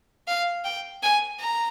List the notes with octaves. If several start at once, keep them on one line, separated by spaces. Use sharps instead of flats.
F5
G5
G#5
A#5